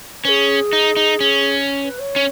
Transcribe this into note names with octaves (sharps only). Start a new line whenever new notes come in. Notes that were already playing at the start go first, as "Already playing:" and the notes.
C#4 G#4 B4
D#4
D#4
C#4
B4
C#5
C#4